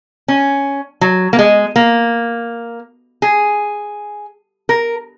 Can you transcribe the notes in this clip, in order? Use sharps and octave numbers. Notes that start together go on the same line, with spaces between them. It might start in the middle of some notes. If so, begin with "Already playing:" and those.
C#4
F#3
A#3
G#3
A#3
G#4
A#4